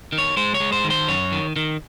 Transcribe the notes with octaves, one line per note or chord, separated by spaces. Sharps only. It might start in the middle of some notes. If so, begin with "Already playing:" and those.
D#3
C#5
G#3 C5
C#5
G#3
C5
D#3
C5
F#2 C#5
D#3
D#3